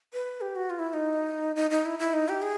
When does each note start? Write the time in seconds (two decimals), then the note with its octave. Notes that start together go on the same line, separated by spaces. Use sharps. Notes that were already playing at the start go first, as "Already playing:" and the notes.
0.13 B4
0.41 G4
0.56 F#4
0.70 F4
0.79 E4
0.89 E4
0.94 D#4
1.56 D#4
1.70 D#4
1.86 E4
1.99 E4
2.13 D#4
2.29 G4
2.42 G#4